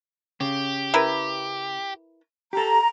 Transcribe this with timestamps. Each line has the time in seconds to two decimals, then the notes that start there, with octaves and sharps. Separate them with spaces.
0.41 C#3 G4
0.94 E4 A#4 B4
2.53 G4 A4 A#5